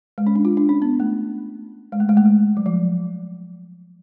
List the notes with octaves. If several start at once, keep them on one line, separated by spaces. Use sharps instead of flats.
G#3
C#4
D4
F4
D4
C#4
B3
A3
G#3
A3
G#3
A3
G#3
F#3
F3